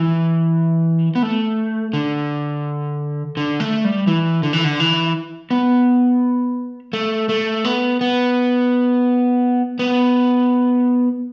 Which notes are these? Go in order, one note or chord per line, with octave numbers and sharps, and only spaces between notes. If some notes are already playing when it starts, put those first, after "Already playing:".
Already playing: E3
B3
A3
D3
D3
A3
G3
E3
D3
E3
D3
E3
B3
A3
A3
B3
B3
B3